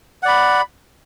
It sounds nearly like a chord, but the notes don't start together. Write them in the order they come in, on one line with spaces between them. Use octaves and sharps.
F#5 D5 B5